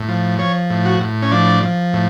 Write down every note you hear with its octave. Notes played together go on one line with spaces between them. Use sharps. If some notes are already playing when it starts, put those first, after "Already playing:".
Already playing: A2
F3
F3 C#5
A2
F#4
A2
C#4
F3 D4
F3
A2